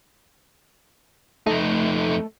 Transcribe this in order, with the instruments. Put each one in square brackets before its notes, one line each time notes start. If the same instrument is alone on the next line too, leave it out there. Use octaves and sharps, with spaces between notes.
[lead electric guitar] F2 D#4 [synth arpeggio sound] A3